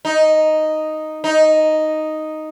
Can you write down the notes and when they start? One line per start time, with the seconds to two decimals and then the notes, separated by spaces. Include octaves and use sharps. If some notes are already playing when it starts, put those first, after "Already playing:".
0.05 D#4
1.24 D#4